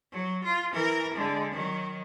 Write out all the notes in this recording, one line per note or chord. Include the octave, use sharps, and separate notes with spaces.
F#3
F4
E3 A#4
D3 G#3
D#3 F#3